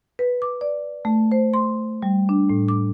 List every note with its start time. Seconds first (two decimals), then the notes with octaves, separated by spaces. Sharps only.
0.19 B4
0.42 D6
0.61 D5
1.05 A3
1.32 C5
1.54 C6
2.02 G3
2.29 D4
2.50 A2
2.68 D6